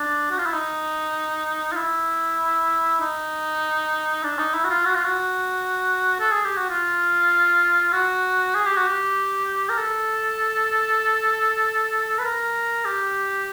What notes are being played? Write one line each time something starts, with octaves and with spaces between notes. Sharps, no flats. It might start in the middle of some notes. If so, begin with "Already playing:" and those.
Already playing: D4
F#4
F4
E4
D#4
F4
E4
D#4
D4
D#4
E4
F#4
F4
F#4
F4
F#4
A4
G#4
G4
F#4
F4
F#4
G#4
G4
F#4
G4
A#4
A4
B4
A#4
G4